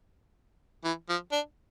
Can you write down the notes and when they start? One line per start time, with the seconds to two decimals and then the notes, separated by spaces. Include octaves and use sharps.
0.84 E3
1.09 F3
1.32 D4